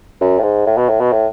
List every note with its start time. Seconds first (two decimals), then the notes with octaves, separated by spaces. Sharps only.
0.21 F#2
0.39 A2
0.43 G#2
0.66 A2
0.78 B2
0.89 A2
1.00 B2
1.13 A2